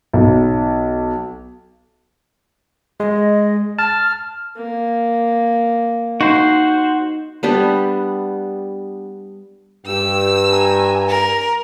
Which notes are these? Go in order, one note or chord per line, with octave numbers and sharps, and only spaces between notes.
B1
G#3 D#5
A5 F6
A#3
D#4 F#4 C5
G3 B3 D4 G4
G2 G4 E6
G#5 A#5
A#4